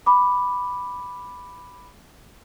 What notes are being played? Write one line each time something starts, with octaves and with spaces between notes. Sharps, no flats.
B5 D6